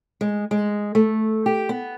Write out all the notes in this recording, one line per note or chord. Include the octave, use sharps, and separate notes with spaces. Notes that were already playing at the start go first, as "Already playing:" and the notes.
G#3
G#3
A3
G4
B3